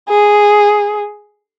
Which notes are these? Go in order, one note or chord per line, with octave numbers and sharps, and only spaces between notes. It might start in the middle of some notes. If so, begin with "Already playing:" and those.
G#4